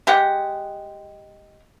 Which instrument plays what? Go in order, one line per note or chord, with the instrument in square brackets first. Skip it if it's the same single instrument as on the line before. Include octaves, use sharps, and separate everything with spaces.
[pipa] G#3 G4 F#5